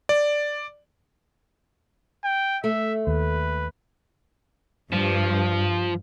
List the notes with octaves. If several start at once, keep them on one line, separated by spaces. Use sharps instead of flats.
D5
G5
A3 E5
D#2 B4
G2 F3